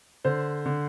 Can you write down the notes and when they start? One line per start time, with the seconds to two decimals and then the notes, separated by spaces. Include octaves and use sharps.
0.24 D3 C5
0.66 D3